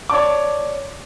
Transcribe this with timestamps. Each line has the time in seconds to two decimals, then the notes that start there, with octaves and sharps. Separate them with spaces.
0.10 C#5 D5 A5 D6